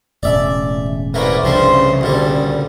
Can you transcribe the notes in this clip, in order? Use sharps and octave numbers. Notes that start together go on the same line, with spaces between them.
E1 A2 C#3 D5 E5
C2 A3 A#3 B4 D5
C2 G2 C#3 F3 A3 C5 C6
D2 A#2 G3 A4